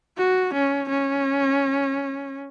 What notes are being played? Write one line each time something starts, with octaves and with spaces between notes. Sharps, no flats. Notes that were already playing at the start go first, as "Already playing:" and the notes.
F#4
C#4
C#4